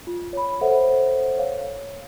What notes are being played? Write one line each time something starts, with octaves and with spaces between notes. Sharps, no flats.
F4
C#5 B5
A4 C5 C#5 E5 F#5
C#5 F5